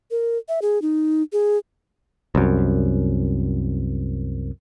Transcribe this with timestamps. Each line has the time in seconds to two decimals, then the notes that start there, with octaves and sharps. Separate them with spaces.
0.11 A#4
0.48 E5
0.62 G#4
0.82 D#4
1.33 G#4
2.35 C2 F#2